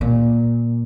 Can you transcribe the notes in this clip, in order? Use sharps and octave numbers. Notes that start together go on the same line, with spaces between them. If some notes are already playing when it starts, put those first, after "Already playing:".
A#2